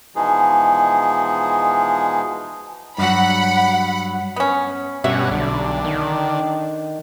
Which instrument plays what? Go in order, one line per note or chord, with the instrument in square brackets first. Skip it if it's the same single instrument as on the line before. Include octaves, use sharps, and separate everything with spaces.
[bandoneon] B2 E3 F3 G#3 D#4 G#4
[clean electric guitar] G2 F#3 [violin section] F#5 B5
[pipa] B3 C#4
[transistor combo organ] G2 C#4 F#4 [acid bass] B2 [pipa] E5
[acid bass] B1 [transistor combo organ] D3
[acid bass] D#3